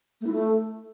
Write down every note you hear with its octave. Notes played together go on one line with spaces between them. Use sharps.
A3
E4
A3